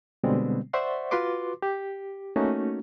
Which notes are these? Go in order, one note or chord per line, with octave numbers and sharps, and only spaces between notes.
B2 D3 G3 G#3 B3 C4
C5 D5 E5 F#5 C6 C#6
F4 F#4 B4 C6 D6
G4
A3 A#3 C#4 D#4 F#4